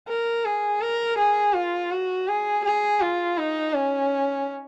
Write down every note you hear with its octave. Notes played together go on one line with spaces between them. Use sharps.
A#4
G#4
A#4
G#4
F4
F#4
G#4
G#4
F4
D#4
C#4